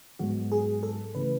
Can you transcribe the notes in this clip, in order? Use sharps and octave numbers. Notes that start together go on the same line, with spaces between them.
G#2 F#3 B3 F#4
G#4
A4
C#3 E3 A3 B4